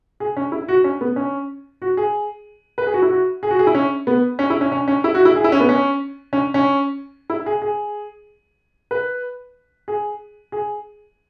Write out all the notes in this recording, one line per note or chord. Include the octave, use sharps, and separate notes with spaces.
G#4
C#4
E4
F#4
C#4
B3
C#4
F#4
G#4
B4
G#4
F#4
E4
F#4
G#4
F#4
G#4
E4
C#4
B3
C#4
E4
C#4
C#4
C#4
E4
F#4
E4
G#4
E4
C#4
B3
C#4
C#4
C#4
E4
G#4
G#4
B4
G#4
G#4